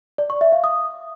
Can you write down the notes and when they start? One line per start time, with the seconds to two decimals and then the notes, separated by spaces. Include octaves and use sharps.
0.18 D5
0.30 C#6
0.41 E5
0.52 F5
0.64 D#6